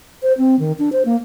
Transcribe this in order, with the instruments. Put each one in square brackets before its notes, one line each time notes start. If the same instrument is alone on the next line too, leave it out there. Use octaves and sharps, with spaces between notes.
[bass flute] C5
C4
D#3
D4
C5
A#3